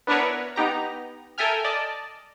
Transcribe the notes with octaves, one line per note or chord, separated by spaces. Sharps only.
B3 D4 E4 A#4 B4 C#5
B3 D#4 G4 A#5
A4 A#4 E5 G5 G#5 F6
D5 D#5 A5